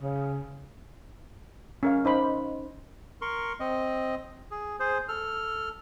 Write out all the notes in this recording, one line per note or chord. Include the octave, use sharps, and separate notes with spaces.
C#3
C#4 A#4 F5
D#4 C5 B5
A#4 C6 C#6
C4 D#5
G#4
G#4 C5
A4 F6